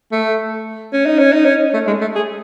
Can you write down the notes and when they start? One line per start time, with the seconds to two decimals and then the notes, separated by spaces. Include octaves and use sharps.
0.12 A3
0.93 C#4
1.06 D#4
1.19 C#4
1.33 D#4
1.45 C#4
1.74 A3
1.87 G#3
2.01 A3
2.15 G#4